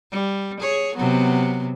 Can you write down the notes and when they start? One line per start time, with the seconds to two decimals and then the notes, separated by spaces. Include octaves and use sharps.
0.11 G3
0.60 G#4 C#5
0.95 C3 F#3 B3